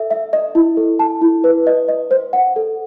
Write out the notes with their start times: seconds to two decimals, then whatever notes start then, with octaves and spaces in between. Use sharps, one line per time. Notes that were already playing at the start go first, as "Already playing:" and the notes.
Already playing: A4 E5
0.11 E5
0.33 D#5
0.55 E4
0.77 A4
0.99 A5
1.22 E4
1.44 B4
1.67 D#5
1.88 D#5
2.11 C5
2.33 F#5
2.56 A4